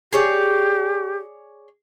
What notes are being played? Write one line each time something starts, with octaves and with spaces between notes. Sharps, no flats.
G4 G#4 C#5 D5